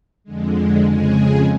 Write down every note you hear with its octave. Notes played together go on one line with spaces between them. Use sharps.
F2 D3 G#3
F2 C#3 G#3 G#4